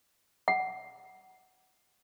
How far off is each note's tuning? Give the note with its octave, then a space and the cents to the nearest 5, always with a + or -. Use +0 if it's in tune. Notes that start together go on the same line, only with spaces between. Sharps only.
F#5 +20